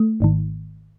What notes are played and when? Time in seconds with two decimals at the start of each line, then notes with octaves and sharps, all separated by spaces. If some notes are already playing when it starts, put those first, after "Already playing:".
Already playing: A3
0.20 G#1 G#2 D#3